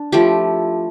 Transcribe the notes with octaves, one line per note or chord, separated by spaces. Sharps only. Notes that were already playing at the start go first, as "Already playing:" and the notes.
Already playing: D4
F3 A3 E4 G4